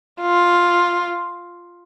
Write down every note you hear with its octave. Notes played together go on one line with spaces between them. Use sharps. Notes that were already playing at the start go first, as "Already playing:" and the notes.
F4